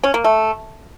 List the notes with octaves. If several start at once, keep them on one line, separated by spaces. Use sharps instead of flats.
C#4
A#3
A3